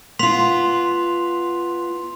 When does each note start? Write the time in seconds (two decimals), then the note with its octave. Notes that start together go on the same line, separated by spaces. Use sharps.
0.19 B3 F4 C6 B6 F7